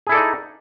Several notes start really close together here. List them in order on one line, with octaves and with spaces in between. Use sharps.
G#4 E4 A4 D5 D#4